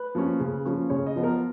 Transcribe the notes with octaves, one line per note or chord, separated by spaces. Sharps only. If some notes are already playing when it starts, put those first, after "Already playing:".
Already playing: B4
F3 A#3 C#4
C#3
F3 A#3 C#4
C#3 C#5
D#5
F3 B3
A#4